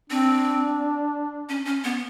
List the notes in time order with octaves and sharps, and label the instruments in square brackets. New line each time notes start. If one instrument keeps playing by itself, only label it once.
[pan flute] C4 [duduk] D4
[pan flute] C#4
C#4
B3